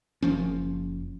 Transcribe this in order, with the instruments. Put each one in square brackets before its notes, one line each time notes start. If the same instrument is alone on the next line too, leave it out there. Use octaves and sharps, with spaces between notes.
[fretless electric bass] F#1 F3 C#4